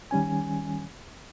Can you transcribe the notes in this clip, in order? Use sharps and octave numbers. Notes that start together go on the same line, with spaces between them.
D#3 G3 C#4 G#5